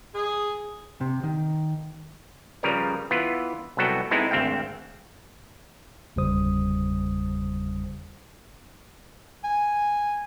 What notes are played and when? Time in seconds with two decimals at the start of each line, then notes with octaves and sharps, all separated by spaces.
0.15 G#4
1.01 C3
1.23 D#3
2.63 C#3 F3 G3 A#4 B4
3.11 E3 B3 F4 B4
3.77 C2 F#3 B3 F#4 A4 G5
4.11 G#3 B3 C4 D#4 E4 A4
4.31 G#1 D2 C4 E5 F5 G5
6.16 G1 E2 C#3 G3 C5 D#6
9.44 G#5